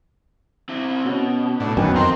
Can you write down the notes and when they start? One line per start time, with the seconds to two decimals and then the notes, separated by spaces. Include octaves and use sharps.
0.69 C4 E4
1.05 B2 B3 C#4 F#4
1.60 A2 D4
1.77 F#2 D#3 B3 A#4 G5 G#5
1.96 F2 C4 D#5 G5 A#5 C6